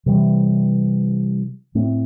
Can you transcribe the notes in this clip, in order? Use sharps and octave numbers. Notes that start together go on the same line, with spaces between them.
C3 E3 G3
A2 A3 C4